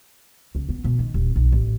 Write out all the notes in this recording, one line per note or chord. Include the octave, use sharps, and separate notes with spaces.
C#2
B3
B2
D#3
D#1
B1
A1